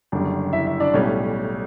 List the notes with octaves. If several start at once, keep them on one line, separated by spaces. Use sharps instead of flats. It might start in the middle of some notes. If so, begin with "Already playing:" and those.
F#1 F#2 D3 G3
E4 E5
E4 E5
D4 D5
B1 A2 G3 C#4 C#5